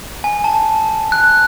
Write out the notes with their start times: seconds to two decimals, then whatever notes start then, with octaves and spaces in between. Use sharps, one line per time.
0.24 G#5
0.44 A5
1.12 F#6